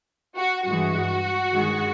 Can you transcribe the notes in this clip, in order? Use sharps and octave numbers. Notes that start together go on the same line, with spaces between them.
F#4
G2 E3 G#3 F#4
G2 D#3 G#3